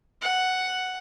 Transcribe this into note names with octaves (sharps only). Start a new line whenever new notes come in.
F#5